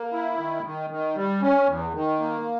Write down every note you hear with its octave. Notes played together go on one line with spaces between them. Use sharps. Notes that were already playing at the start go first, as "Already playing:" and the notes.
Already playing: A#3
E4
D#3
D#3
D#3
G3
C#4
E2
D#3
A#3